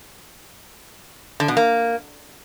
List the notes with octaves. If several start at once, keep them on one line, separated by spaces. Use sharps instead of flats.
D3
B2
A#3